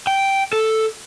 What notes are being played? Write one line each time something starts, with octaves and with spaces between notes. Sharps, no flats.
G5
A4